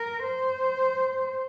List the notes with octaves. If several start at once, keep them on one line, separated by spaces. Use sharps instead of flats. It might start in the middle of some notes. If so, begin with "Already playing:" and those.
Already playing: A#4
C5